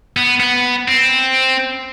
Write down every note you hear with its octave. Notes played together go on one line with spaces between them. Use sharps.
B3
B3
C4